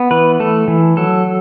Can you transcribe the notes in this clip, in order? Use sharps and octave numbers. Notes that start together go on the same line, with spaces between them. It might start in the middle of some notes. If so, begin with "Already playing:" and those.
Already playing: B3
E3 B4
A3 A4
E3
F#3 A4